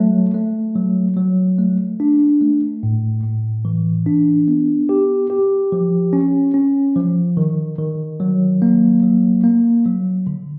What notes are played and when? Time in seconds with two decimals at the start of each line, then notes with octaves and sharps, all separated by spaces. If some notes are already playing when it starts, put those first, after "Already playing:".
Already playing: F#3 A3
0.34 A3
0.75 F#3
1.17 F#3
1.58 A3
2.00 D4
2.41 A3
2.83 A2
3.23 A2
3.65 E3
4.06 D4
4.48 B3
4.89 G4
5.30 G4
5.72 F3
6.13 C#4
6.54 C#4
6.96 F3
7.37 D#3
7.79 D#3
8.20 F#3
8.62 A#3
9.03 F#3
9.44 A#3
9.86 F#3
10.27 D3